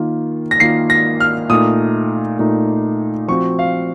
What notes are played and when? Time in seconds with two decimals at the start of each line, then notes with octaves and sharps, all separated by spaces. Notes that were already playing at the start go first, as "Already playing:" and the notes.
Already playing: D#3 A#3 F4
0.51 A#6
0.60 D#3 A#3 F4 C7
0.90 A#6
1.20 F6
1.50 A#2 A3 D#4 D#6
2.39 A#2 A3 D#4
3.28 F3 C4 F#4 C#6
3.59 F5